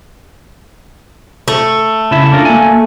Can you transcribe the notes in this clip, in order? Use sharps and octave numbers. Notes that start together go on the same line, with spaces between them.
A3
C#3 E4 E5
D4 F4 A#4
A#3 G#5